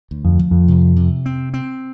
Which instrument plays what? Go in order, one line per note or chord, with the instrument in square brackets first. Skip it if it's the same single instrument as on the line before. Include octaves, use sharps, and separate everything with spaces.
[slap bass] D2
[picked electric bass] F2
[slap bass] F3
[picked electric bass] F2
[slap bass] C3
C3
C4
C4